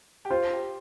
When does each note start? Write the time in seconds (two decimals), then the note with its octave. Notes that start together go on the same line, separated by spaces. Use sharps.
0.25 G4
0.30 F4 C5
0.53 G4